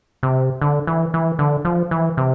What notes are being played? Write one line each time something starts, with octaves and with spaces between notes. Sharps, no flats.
C3
D3
E3
E3
D3
F3
E3
C3